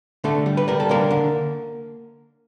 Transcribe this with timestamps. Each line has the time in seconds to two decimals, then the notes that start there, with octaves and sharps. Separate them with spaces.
0.24 D3 A3 A4
0.46 G3
0.57 B4
0.68 G3 A#4
0.80 A4
0.89 D3 A#3 A#4
1.11 D3